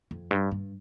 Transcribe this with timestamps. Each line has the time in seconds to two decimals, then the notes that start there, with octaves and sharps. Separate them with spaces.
0.11 F2
0.31 G2
0.51 G2